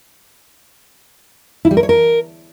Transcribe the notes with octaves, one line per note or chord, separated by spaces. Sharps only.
E4
G3
A#4
C#5
A#4